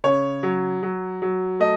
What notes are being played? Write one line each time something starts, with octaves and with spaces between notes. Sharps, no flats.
C#3 C#5
F#3
F#3
F#3
A3 D#5